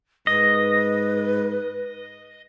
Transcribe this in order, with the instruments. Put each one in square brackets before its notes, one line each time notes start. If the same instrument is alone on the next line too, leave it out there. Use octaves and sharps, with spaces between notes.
[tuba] G#2 [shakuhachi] B4 [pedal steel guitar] D#5